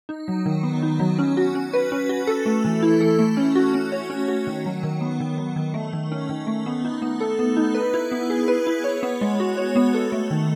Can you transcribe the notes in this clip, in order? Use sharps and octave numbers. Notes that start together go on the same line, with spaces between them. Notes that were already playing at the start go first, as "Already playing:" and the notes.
D#4
F#3
D#3
B3
D#4
F#3
C#4
F#4
C#4
B4
C#4
F#4
A4
A3
E3
E4
A4
A3
C#4
F#4
C#4
C#5
C#4
F#4
D#3
F#3
D#3
B3
D#3
F#3
D#3
A3
D#3
C#4
D#3
A3
B3
D#4
B3
A4
B3
D#4
B4
E4
B3
G#4
B4
E4
C#5
B3
G#3
F#4
C#5
B3
A4
A3
D#3